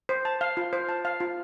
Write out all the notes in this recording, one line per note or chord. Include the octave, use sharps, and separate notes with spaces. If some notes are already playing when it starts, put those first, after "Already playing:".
C5
A5
F5
F4
C5
A5
F5
F4